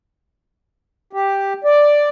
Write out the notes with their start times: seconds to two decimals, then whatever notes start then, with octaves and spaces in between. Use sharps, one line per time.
1.13 G4
1.64 D5